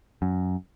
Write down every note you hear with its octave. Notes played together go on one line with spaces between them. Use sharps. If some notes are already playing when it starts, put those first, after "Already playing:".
F#2